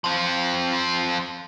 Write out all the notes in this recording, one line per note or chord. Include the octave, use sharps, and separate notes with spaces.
F3 C4